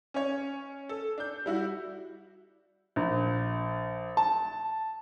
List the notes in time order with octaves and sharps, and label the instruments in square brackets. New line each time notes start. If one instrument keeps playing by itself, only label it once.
[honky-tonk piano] C#4 C#5
A4
D4 G6
G3 E4 F#4
[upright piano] A#1
A5